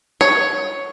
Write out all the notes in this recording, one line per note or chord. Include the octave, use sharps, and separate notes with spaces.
C#5